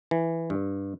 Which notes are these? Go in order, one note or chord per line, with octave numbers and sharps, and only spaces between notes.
E3
G2